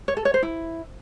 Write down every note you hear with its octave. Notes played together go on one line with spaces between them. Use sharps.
C#5
A4
C#5
C5
E4